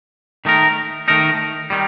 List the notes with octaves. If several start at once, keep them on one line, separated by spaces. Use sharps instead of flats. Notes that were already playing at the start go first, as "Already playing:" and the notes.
D#3 A3 D#4 A#4
D#3 A3 D#4 A#4
D#3 G3